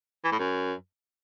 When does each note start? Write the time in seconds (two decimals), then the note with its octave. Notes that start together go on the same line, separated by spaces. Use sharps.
0.24 E3
0.32 A2
0.39 F#2